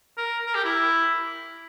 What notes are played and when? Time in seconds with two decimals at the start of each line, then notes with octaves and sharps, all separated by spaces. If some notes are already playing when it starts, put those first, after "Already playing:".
0.17 A#4
0.46 A#4
0.55 G4
0.64 E4